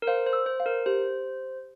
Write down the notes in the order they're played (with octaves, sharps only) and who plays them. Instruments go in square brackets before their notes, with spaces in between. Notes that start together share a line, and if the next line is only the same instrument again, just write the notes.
[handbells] A#4
[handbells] C5 [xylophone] F5
[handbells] C5
[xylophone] E6
[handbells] C5
[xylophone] F5
[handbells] A#4
[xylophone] G4 [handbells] C5